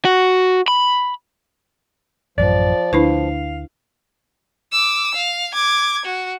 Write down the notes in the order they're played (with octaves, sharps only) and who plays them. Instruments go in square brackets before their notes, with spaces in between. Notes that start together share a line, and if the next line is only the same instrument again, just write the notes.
[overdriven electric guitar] F#4
B5
[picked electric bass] A1 F#2 [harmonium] F3 [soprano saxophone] D5
[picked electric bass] D2 [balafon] D4 E4 B4 [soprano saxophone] F5
[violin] D6 E6
F5
D6 G#6
F#4